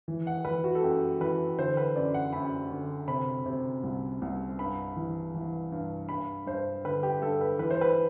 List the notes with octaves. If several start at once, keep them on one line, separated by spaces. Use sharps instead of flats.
E3
F#5
E3 B4
F#4
A4
F#2 G4
E3 B4
D3 C5
B4
F#2 D5
F#5
F#2 B5
D3
C3 B5
C3
C2
C2
G2 B5
E3
E3
G2
G2 B5
G2 C5
D3 B4
G4
G2 A4
B4
E3 B4
C5
B4